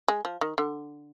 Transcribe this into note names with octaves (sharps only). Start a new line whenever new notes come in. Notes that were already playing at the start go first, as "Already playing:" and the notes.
G#3
F3
D#3
D3